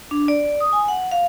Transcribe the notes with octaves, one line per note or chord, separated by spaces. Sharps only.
D4
D5
D#6
G#5
F#5
F5